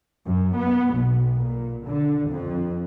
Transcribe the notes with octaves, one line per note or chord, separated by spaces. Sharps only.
F#2
B3
B1
A#2
D3
F2